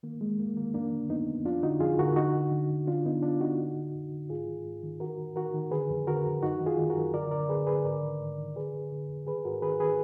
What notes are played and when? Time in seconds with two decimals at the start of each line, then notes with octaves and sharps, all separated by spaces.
0.03 D#3 A#3
0.21 D#3 G#3
0.39 F2 A#3
0.56 D#3 A#3
0.74 F2 A#3 D4
0.92 D3
1.10 F2 B3 D#4
1.28 F2
1.45 F2 D4 F4
1.63 D3 D#4 F#4
1.80 F2 F4 G#4
1.99 D3 F#4 A#4
2.16 D3 D#4 F#4
2.34 D3
2.52 D3
2.70 D3
2.87 D3 D4 F4
3.05 D3 B3 D#4
3.22 D3 D4 F4
3.41 D3 D#4 F#4
3.59 D3
3.76 D3
3.94 F2
4.12 D3
4.29 G#2 F4 G#4
4.48 D#3
4.65 G#2
4.83 D#3
5.00 D#3 F#4 A#4
5.18 D#3
5.36 D#3 F#4 A#4
5.54 D#3
5.71 D3 G#4 B4
5.90 F2
6.07 D3 F#4 A#4
6.25 F2
6.43 F#2 D#4 F#4
6.61 D#3
6.66 F4 G#4
6.78 D#3
6.90 F#4 A#4
6.96 F#2
7.14 D3 A#4 D5
7.31 D3 A#4 D5
7.49 D3 G#4 B4
7.67 D3 G#4 B4
7.84 G#2 A#4 D5
8.03 D#3
8.20 G#2
8.38 D#3
8.56 D3 G#4 B4
8.74 D3
8.92 D3
9.09 F2
9.27 D#3 G#4 B4
9.45 G#2 F#4 A#4
9.62 D#3 G#4 B4
9.80 D#3 G#4 B4